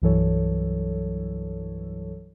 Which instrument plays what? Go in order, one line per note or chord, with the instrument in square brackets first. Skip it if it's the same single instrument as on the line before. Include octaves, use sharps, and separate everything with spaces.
[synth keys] C2 G2 E3 F#3 A4 C#5